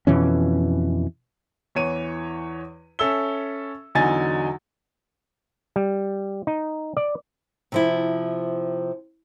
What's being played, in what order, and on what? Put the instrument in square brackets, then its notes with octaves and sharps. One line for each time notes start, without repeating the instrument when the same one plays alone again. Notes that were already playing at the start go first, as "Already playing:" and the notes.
[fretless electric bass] F2 B2 E3 C#4
[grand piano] E2 E3 C#5 D#7
C#4 A4 E5 E6 G7
E2 D3 F#3 D#4 G#5 A6
[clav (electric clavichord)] G3
D#4
D5
[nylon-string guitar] C3 F3 E4